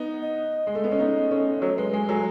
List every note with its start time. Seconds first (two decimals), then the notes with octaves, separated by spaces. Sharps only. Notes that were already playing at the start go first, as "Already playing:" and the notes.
Already playing: B3 D#4
0.22 D#5
0.67 G#3
0.75 A3
0.84 B3
0.92 C#4
0.99 B3 D#4
1.31 A3 C#4
1.61 F#3 A3 C#5
1.77 G#3 B4
1.93 G#3 G#5
2.08 F#3 A3 G#5